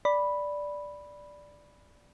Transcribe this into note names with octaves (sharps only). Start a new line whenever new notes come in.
D5 B5